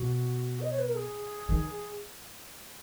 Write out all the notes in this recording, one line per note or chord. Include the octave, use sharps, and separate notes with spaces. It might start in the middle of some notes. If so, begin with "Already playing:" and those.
Already playing: B2 F#4
D#5
C#5
B4
A#4
G#4
D#3